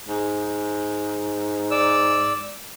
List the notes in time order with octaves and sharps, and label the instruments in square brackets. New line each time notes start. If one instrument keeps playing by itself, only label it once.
[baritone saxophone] G#2
[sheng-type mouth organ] D5 E6